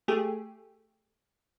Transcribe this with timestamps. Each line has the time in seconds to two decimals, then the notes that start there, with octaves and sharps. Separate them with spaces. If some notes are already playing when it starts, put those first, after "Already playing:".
0.08 A3 G4 G#4